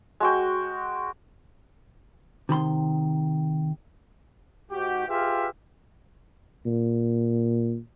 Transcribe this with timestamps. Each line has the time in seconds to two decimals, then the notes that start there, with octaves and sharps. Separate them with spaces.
0.20 G#3 F#4 G5
2.49 C3 D#3 B5 C6
4.71 G#2 F#4 G4
5.08 F4 G4 G#4 B4 E5 F5
6.66 A#2